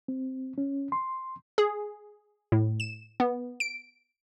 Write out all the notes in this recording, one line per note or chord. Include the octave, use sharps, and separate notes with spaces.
C4
C#4
C6
G#4
A2
E7
B3
D7